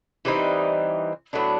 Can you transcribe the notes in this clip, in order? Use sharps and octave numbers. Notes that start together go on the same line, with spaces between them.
E3 G3 C4 D#4
A2 F#3 B3 D4